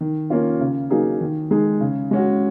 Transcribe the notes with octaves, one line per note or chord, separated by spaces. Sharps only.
D#3
A#3 C#4 F4
C#3
F#3 A#3 D#4 G#4
D#3
G#3 D#4 G#4
C#3
G#3 C#4 F#4